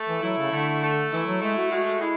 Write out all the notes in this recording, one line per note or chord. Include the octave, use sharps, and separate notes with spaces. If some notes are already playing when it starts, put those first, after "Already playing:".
Already playing: A3 A4
E3
F#3 E4
C#3
D3 A3
A3
E3 E4
F#3
G#3 A3
F#4
G#3 F#4
G#3 E4